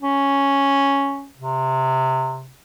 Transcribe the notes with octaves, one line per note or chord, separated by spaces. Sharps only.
C#4
C3